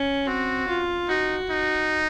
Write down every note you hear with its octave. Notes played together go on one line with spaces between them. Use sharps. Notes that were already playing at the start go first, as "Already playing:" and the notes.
Already playing: C#4
C4 F#4
F4
D#4 F#4
D#4